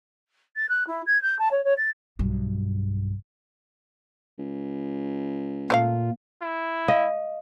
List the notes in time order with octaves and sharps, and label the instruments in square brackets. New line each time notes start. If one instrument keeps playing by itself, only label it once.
[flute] A6
F#6
E4
G#6
G6
A5
C#5
C#5
A6
[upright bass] B1 G2
[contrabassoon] C#2
[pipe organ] A#2 F4 [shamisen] A3 D5 F5
[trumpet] E4
[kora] D#5 [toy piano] F5